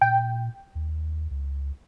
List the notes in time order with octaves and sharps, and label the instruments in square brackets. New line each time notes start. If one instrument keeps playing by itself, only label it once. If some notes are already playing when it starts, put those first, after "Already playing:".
[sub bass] A#2 [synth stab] G5
[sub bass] D#2
C#2